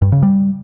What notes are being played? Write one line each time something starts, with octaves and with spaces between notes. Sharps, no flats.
G2
C#3
G3